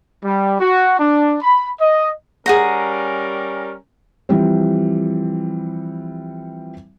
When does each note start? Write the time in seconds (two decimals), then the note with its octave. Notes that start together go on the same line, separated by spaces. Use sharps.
0.24 G3
0.60 F#4
1.00 D4
1.41 B5
1.81 D#5
2.46 G3 C#4 G#4 A#4 F#5 A#5
4.29 E3 F3 G3 C4